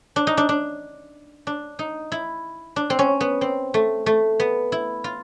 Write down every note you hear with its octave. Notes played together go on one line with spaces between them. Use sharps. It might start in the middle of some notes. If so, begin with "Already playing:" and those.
D4
D#4
D4
D4
D4
D#4
E4
D4
C4
C#4
B3
C4
A3
A3
B3
E4
F4